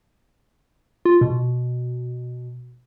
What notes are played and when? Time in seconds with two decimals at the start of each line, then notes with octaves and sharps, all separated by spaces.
1.05 F4
1.21 B2